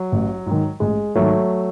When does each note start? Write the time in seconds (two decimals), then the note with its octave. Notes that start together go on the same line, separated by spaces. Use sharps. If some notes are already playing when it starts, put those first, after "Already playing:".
Already playing: F#3
0.12 A1
0.46 G#2 D#3
0.80 A1 G#3
1.15 G#2 D#3 F#3 A3